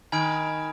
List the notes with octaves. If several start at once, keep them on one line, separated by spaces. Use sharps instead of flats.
D#3 G#5 B5 F6 G#6 D7